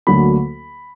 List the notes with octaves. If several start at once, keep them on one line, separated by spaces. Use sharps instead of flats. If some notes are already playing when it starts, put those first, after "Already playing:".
D2 D3 F#3 A#3 B5